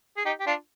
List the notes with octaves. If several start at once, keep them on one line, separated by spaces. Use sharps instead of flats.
G#4
D#4 G4
G4
D4 F4